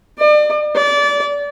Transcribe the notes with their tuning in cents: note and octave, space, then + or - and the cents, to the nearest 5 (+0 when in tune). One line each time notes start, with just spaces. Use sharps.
D5 +40
D5 -25